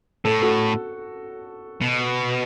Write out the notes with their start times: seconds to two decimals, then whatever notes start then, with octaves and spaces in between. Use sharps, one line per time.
0.25 A2 A4
0.42 F#4 A4
1.81 B2